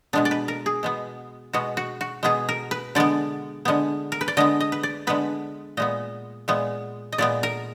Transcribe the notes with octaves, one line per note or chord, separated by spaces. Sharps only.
B2 G#3 B3 D4
D5
B4
A#4
G#4
B2 G#3 B3
B2 G#3 B3 F#4
F#4
F#4
B2 G#3 B3 G#4
A#4
B4
D3 G#3 B3 D5
D3 G#3 B3
A#4
B4
D5
D3 G#3 B3 D#5
D#5
B4
D5
D3 G#3 B3 B4
A#2 G#3 B3 D#5
A#2 G#3 B3
D#5
A#2 G#3 B3 D5
A#4